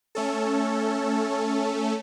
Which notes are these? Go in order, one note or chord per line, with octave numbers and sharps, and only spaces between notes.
A3 C#4 A4